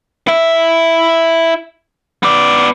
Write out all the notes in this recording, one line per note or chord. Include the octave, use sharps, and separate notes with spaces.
E4 E5
B3 D5